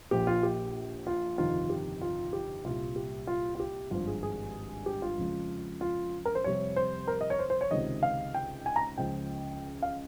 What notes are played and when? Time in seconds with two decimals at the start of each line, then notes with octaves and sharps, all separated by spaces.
0.11 A#1 A#2 F3 G4
0.27 F4
0.43 G4
1.07 F4
1.38 G1 F2 C3 D#3 F4
1.70 G4
2.01 F4
2.33 G4
2.65 C2 A#2 G3 F4
2.96 G4
3.27 F4
3.55 F4
3.60 G4
3.91 G#1 G2 F3 F4
4.07 G#4
4.23 G#4
4.86 G4
5.02 F4
5.18 F2 C#3 G#3
5.81 F4
6.25 A#4
6.35 C5
6.44 F2 C3 G3 C#5
6.76 C5
7.08 A#4
7.21 D#5
7.30 C#5
7.39 C5
7.50 C5
7.61 C#5
7.71 C#2 C3 D#3 D#5
8.03 F5
8.34 G5
8.66 G#5
8.76 A#5
8.98 C#2 C#3 F3 G5
9.82 F5